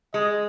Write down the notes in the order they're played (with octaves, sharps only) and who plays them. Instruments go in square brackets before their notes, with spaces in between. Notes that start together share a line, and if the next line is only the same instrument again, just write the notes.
[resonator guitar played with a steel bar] G#3 [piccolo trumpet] D#5